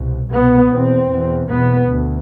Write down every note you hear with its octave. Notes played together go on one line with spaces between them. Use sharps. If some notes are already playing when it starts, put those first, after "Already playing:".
Already playing: C2 B2
C2 B2 B3
E2 B2 C4
E2 B2
E2 B2 B3
D2